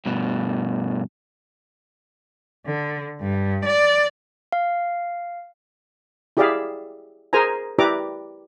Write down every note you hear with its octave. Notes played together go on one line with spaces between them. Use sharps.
G2 B2
D3
G2
D5
F5
E4 G4 G#4 D5 E5 F5
G#4 A#4 C5 G#5 A#5
E4 G4 B4 D5 A#5 D6